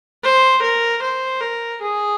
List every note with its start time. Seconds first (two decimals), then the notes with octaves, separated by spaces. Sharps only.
0.23 C5
0.62 A#4
1.03 C5
1.41 A#4
1.81 G#4